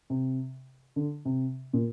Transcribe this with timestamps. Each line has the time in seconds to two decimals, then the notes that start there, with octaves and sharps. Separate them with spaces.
0.10 C3
0.96 D3
1.25 C3
1.73 A#2